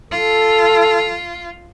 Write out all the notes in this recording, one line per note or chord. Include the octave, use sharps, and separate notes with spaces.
F4 A4